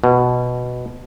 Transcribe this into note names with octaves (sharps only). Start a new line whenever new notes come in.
B2